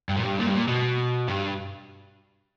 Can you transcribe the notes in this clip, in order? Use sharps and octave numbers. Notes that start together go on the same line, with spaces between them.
G2
A#2
G2
A#2
G2
A#2
B2
G2